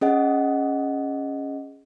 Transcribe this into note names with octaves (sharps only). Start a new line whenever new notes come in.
C#4 G#4 D#5 F#5